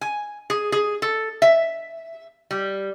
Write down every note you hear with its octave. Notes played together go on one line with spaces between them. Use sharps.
G#5
G#4
G#4
A4
E5
G3